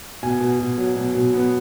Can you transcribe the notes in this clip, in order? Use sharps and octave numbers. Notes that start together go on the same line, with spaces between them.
B2 G#5
B2
B2
F#3
B2
B2
B3